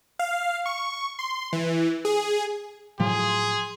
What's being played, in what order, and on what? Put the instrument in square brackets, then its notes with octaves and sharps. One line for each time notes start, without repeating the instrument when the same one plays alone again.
[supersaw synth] F5
C#6
C6
E3
G#4
[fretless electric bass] A2 F3 F#3 [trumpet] G#4 [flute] C6